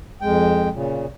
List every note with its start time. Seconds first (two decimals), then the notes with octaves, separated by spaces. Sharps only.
0.22 F2 G#3 G5
0.73 A#2 C#3